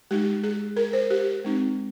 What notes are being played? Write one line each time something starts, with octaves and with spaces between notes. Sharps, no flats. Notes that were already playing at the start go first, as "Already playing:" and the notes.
G#3 D#4 G4
G#4
A#4
C5
G4
G#3 C4 D#4